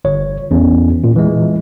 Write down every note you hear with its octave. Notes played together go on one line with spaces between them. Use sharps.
G1 C#5
E2 C#4
A#2
E3 G#3